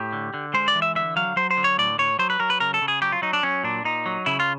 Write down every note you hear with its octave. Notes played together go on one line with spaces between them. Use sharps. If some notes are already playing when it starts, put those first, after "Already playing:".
Already playing: A2 G4
D3
D3
G#3 C5
D5
E3
E5
D3 E5
F#3 F5
F#3 C5
C5
D3
C#5
A2 D5
A2 C#5
F#3 C5
B4
F#3 A#4
B4
C#3 A#4
A4
C#3
G#4
F#3 G4
F4
F#3 D#4
D4
F#3 C#4
A#2 D4
A#2 D#4
F#3
C#3 E4
F4